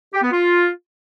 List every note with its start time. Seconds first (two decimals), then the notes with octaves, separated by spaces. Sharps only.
0.14 G4
0.23 B3
0.32 F4